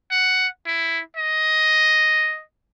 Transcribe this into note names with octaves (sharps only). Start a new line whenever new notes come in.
F#5
E4
D#5